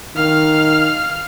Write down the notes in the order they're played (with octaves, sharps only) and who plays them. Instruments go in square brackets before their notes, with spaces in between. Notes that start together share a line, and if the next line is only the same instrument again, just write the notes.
[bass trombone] D#3 [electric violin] F5 F6